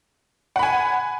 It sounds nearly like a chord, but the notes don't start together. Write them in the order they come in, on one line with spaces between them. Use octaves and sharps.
F#5 B5 G#5